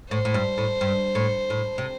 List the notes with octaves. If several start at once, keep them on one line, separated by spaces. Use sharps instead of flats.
A2 C5
A2
G2
A2
G2
A2
A2
C3